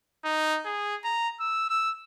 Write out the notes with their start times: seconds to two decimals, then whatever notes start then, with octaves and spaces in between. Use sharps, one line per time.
0.25 D#4
0.65 G#4
1.05 A#5
1.40 E6
1.70 E6